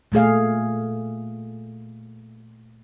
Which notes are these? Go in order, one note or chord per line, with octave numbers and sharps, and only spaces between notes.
A#2 A3 G#4 F5